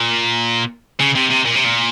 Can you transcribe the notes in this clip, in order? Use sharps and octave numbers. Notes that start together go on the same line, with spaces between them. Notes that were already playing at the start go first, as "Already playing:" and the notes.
Already playing: A#2
C#3
C3
C3
A#2
C3
A#2